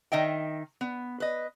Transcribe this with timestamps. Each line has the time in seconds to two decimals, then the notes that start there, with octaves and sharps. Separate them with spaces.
0.12 D#3 D#5 E5 G5
0.81 B3
1.20 B4 D#5